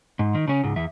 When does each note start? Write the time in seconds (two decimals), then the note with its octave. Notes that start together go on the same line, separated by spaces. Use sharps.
0.19 G#2
0.35 D#3
0.48 C#3 C#4
0.64 C#2 G#2
0.76 E2 E5